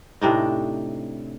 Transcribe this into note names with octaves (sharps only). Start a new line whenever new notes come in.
A2 C3 D4 D#4